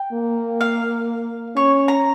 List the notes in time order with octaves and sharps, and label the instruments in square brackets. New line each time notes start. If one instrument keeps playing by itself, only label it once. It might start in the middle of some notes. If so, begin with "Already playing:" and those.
Already playing: [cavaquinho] G5
[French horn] A#3
[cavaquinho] F5
[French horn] C#4 [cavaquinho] C#5
[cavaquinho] A#5